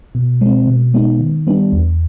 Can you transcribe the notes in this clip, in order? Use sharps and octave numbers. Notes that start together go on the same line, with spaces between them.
B2
G#3 C4
B2
G#3 B3 D#4
D#3
G3 B3 D4
E2